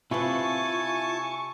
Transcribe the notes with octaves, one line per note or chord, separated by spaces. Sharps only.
C3 E4 F4 B4 G#5 A5 C#6